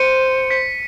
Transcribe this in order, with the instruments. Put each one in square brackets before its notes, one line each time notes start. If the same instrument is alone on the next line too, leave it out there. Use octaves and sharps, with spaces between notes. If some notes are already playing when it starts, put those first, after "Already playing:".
Already playing: [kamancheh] C5 [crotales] C#7 D#7
[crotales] B6 C#7